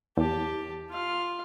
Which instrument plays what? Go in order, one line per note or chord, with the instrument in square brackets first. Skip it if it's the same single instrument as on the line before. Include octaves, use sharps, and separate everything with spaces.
[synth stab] E2 [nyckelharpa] G4 A5
[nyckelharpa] F4 F5